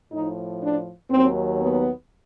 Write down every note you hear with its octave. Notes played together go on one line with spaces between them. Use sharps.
A2 F3 D#4
D4
D#2 D#3 F#3 C4
B3